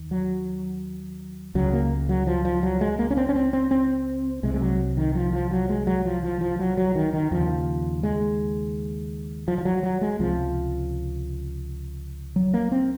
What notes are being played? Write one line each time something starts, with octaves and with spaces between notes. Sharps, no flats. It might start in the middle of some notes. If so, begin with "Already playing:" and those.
Already playing: D#2
F#3
C#2 C#3 F#3
A#3
F#3
F3
F3
F#3
G#3
A#3
C#4
C4
C#4
C4
C4
C4
C2 C3 G#3
G#3
F#3
D#3
F3
F3
F#3
G#3
F#3
F3
F3
F3
F#3
F#3
D#3
D#3
D#2 C#3 F3
G#3
F3
F3
F#3
F#3
G#3
C#2 C3 F3
F#3
A#3
C4